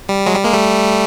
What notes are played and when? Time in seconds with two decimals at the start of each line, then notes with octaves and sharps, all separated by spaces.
0.09 G3
0.26 F#3 G#3
0.35 G3
0.44 G#3 A#3
0.53 G3 A3